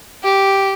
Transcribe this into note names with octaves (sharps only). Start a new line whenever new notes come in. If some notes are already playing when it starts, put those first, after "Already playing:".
G4